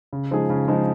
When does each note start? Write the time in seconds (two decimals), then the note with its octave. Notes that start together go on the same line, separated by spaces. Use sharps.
0.13 C#3
0.31 F3 G#3 D#4 G#4
0.50 C#3
0.68 F3 G#3 D#4 G#4